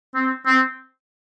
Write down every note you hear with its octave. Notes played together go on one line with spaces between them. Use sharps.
C4
C4